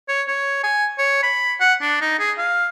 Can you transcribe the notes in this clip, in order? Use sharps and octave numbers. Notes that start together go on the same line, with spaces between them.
C#5
C#5
G#5
C#5
B5
F#5
D4
D#4
G#4
F5